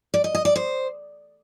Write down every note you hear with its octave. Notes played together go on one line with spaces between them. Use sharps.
D5
D#5
D#5
D5
C5